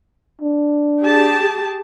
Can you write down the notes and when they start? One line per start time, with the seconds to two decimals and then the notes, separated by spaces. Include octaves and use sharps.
0.41 D4
1.01 G4 G#4 A5